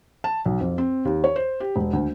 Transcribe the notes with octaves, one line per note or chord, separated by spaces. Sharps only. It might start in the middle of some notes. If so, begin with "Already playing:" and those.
A5
B1
F2
C4
D#2
C#5
C5
G4
E1
D2